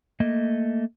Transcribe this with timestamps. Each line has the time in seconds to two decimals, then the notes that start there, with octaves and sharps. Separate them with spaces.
0.20 A3 A#3 D#5